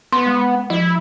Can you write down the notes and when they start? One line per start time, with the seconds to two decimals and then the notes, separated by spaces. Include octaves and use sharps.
0.12 B3 C6
0.26 G#3
0.70 F3 E4